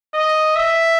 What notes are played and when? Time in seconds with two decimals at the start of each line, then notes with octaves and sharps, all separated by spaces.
0.14 D#5
0.56 E5